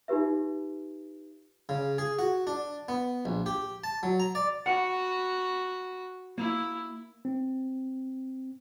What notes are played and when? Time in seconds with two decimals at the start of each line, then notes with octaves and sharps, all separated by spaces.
0.08 D#4 F4 G4 B4 E5
1.69 C#3
1.98 G#4
2.19 F#4
2.47 D4
2.88 B3
3.25 A#1
3.46 G4
3.84 A5
4.03 F#3
4.20 A#5
4.35 D5
4.66 F#4 F#5 B5
6.38 A#3 E4
7.25 C4